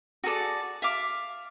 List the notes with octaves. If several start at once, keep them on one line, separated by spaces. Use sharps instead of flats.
F#4 G#4 A4 D5
E5 F5 D6